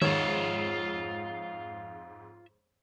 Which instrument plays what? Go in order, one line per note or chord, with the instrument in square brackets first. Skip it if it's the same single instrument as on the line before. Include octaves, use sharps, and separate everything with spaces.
[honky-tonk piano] F2 G#2 G#3 [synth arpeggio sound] D#3 [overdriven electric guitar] F4 E5 [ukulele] C#5